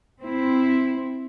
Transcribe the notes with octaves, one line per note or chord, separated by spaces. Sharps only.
C4 E4